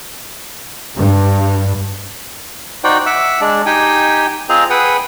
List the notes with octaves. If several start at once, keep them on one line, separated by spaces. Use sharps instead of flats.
G2
D#4 F#4 C5 D5 G5
E5 F#5 D6 E6
G#3 D4 D5
D#4 G4 G5 G#5
C4 F4 G#4 C5 D#5 A#5
G#4 B4 F#5 G5 D#6